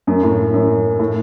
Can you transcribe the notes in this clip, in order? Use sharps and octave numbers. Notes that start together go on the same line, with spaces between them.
F#2
A2
F#2
A2